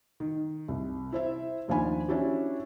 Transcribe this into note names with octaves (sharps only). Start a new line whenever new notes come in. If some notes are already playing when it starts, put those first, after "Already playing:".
D#3
C2
E4 C5 E5
D#2 D#3 F3 D4 G#5 B5
C#4 D4 E4 F#4 G4